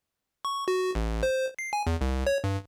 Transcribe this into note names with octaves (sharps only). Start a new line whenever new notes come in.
C#6
F#4
A1
C5
C7
G#5
E2
C2
C#5
G2